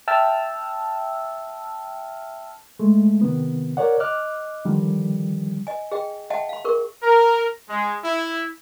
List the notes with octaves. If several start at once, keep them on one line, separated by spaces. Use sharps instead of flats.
E5 G5 A5 E6 F6
G#3 A3
C3 D#3 B3
A#4 C#5 D5 F#5
D#5 D6 F6 F#6
D3 D#3 F3 G3
D#5 G#5
G#4 D#5 G5
D#5 E5 F#5 G5 A5
F5 B5
G#4 A#4 C#6
A#4
G#3
E4